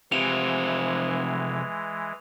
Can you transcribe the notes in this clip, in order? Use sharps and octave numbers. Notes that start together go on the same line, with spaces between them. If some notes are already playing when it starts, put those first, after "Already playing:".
C3 E3 F3 G#3 F7